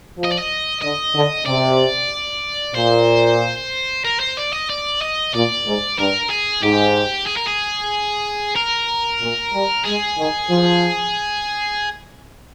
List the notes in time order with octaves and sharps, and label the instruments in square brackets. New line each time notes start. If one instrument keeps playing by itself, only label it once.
[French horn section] F3
[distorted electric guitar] D#5
D5
D#5
[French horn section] D3 [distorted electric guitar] D#5
[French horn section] D3
[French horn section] C3 [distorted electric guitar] D5
[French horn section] A#2 [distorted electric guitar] C5
[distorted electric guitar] A#4
C5
D5
D#5
D5
D#5
[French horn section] A#2 [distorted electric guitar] D5
[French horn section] G#2
[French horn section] G2 [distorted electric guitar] A#4
[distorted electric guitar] G#4
[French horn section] G#2 [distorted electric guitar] G4
[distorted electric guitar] G#4
A#4
G#4
A#4
[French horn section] A#2
G3
[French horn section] G#3 [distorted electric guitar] G#4
[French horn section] D#3
F3